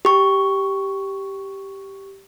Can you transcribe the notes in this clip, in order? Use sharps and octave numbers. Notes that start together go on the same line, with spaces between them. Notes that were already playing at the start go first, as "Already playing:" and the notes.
G4 C#6